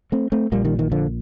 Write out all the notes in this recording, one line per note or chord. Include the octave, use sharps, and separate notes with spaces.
A3 C4
A3 C4
A#1 A#2 G3 A#3
D#3 G3
D#3
D3 F3